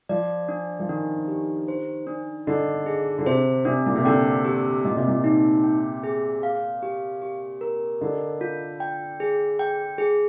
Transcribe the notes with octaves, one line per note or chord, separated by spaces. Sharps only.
F3 D5
D4
F3
D#3 D4
G4
C5
D4
D3 D#5
G#4
D3
C3 C5
C3 D4
A#2
C3
D3 G5
G4
A#2 D#5
C3
A#2
D#4
G5
G#4
F5
G4
G4
A#4
D3 D#5
F4
G5
G#4
G5
G#4